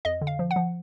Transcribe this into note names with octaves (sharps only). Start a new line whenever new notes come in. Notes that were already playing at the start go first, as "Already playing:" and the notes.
F2 D#5
D3
F5
F3
F#5
F3